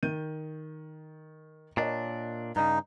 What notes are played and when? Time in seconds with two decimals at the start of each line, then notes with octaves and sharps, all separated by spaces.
0.03 D#3 G6 D#7
1.77 A#2 D4 A#4 C#5 D#5
2.56 G2 C#3 D#4